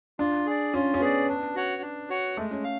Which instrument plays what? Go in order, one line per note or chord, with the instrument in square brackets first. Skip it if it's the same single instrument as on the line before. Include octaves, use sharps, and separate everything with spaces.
[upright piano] D4 [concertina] F4
[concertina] G#4 D5
[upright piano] C#4 [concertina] F4
[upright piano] C#4
[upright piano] B3 [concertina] G#4 D5
[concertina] D4
F#4 C#5 F#5
D4
F#4 C#5 F#5
[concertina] G#3 [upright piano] A3
[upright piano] C#4
[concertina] F5